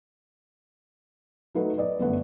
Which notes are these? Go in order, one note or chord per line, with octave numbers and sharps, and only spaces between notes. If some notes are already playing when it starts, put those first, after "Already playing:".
F#3 A3 D#4 A4 B4 F#5
B4 D5 D#5
G1 F#2 A3 B4 F#5